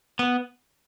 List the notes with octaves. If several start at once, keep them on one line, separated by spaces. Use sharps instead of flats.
B3